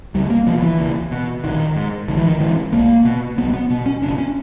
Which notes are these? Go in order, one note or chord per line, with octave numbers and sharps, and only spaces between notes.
C#2 G3
A#3
B2 F3
E3
C#2
B2
A#1 D#3
G#2
A#1 D#3
E3
D#3
G#2 E3
B1 A#3
B2
B1 B3
B3
B2
C#4
F#1 D4
C#4